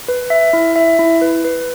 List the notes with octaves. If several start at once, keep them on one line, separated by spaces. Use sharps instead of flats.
B4
E5
E4
E5
E4
B4
B4